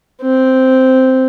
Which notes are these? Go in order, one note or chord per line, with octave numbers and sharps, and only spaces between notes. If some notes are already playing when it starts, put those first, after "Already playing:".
C4